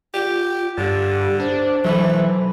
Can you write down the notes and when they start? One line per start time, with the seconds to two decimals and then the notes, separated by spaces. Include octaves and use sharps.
0.14 F4 G4
0.78 G2 D3 G4
1.40 D4 C5
1.84 E3 F#3 A3 B4